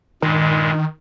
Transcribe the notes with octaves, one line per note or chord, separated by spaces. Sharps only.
G2 A#2 D#3 G#3